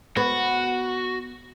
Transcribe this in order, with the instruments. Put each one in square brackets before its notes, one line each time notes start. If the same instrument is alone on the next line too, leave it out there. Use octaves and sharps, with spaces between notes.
[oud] B3 [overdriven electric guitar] F#4